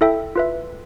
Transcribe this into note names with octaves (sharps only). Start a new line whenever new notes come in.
E4 A4 E5 G5
F4 B4 E5